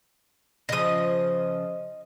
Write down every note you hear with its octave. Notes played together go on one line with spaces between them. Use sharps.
C#3 F3 D#5 D#6